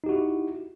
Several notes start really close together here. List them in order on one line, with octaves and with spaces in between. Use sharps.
D#4 G4 F#4 E4